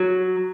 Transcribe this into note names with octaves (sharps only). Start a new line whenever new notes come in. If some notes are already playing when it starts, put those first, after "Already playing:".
Already playing: F#3